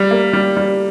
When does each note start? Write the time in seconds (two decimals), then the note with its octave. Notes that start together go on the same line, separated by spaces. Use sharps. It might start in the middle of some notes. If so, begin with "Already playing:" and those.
Already playing: G3
0.11 A#3
0.33 G3
0.57 G3